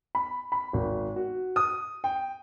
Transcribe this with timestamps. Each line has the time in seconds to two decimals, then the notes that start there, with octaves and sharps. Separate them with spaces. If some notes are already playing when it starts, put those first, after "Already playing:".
0.15 B5
0.52 B5
0.73 G#1
1.16 F#4
1.56 D#6
2.04 G5